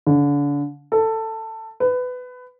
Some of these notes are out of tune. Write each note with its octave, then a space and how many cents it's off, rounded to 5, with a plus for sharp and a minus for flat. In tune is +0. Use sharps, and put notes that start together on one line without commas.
D3 -35
A4 +15
B4 +20